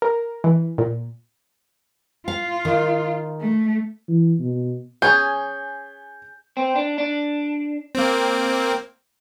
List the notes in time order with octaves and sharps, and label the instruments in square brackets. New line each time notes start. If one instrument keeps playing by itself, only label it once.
[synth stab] A#4
E3
A#2
[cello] F4 [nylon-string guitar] F5
[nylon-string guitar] D#3
[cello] A3
[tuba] E3
B2
[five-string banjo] C#4 G#4 [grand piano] G6
[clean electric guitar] C4
D4
D4
[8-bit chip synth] A#3 C4